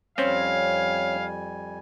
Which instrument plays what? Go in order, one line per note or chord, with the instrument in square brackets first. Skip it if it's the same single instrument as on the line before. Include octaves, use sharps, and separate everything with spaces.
[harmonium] F2 G3 G#5 [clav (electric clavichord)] C4 C#4 C5 [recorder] C#5 [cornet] F5